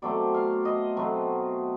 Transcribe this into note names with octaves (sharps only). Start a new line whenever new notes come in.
B2 F#3 A3 C4 D5
F5
D#5
B2 F#3 A3 C4